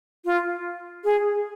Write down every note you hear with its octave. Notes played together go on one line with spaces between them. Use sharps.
F4
G#4